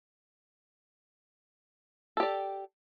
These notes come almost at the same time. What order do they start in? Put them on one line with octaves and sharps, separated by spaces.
A4 G4 D5